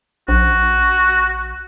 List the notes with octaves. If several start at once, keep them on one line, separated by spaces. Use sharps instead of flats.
A#1 F#4